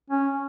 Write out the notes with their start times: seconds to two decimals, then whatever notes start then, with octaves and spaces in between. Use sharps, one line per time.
0.10 C#4